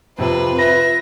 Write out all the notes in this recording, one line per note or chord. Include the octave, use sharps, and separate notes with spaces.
F2 C3 F4 B4 C5
B4 E5 A#6